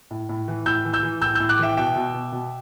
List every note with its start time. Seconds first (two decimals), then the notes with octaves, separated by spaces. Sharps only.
0.11 A2
0.29 A2
0.48 E3
0.66 A2 E6 G6
0.85 E3
0.93 E6 G6
1.03 E3
1.21 A2 E6 G6
1.35 E6 G6
1.40 A2
1.49 D6 F#6
1.59 E3 E5 G5
1.77 B2 E5 G5
1.96 B2
2.14 B2
2.32 B2